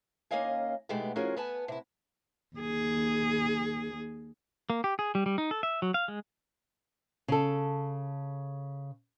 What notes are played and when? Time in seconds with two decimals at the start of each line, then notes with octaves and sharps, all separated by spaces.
0.31 D#2 A#3 C#4 D#5 F5 G#5
0.89 B2 G#3 A3 B3 D#4 G4
1.16 F3 C#4 F4 F#4 G#4 A#4
1.37 B3 B4 G#5 A5
1.68 C3 E4
2.56 D#2 G#4
4.70 A#3
4.84 G4
4.99 G#4
5.15 G3
5.26 G3
5.38 D#4
5.51 A4
5.63 E5
5.82 F#3
5.94 F5
6.08 G#3
7.28 C#3 A4